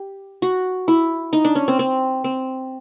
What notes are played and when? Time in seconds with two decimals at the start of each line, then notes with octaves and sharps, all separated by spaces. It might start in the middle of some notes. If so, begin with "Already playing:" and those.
Already playing: G4
0.42 F#4
0.88 E4
1.33 D#4
1.45 D4
1.55 C#4
1.68 C4
1.79 C4
2.24 C4